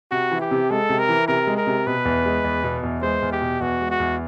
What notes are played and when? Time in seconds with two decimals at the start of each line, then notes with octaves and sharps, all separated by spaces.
0.11 C3 F#4
0.31 E3
0.41 G4
0.51 C3
0.70 G#3 A4
0.90 C3
0.99 A#4
1.09 E3
1.28 C3 A#4
1.47 G#3
1.57 A#4
1.67 C3
1.87 B2 B4
2.05 E2
2.26 G#3
2.44 E2
2.64 B2
2.83 E2
3.02 G#3 C5
3.22 E2
3.32 G4
3.42 B2
3.61 E2 F#4
3.81 G#3
3.90 F#4
4.00 E2